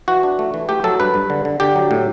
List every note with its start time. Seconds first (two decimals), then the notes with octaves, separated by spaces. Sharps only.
0.08 E3 F#4
0.23 D4
0.39 A3
0.54 E3
0.69 A3 G4
0.84 F#3 A4
1.00 G2 B4
1.14 G2
1.30 D3
1.45 D3
1.60 D3 G4
1.76 F#3
1.91 A2